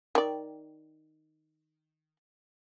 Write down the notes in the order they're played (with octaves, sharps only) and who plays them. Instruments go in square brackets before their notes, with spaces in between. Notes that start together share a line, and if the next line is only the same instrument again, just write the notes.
[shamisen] D#3 D5